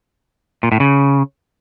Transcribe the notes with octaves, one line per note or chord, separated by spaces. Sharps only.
A#2
A2
C#3